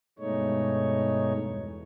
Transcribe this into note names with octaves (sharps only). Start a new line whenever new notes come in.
G2 B2 G#3 A3 D#4 C#5
E2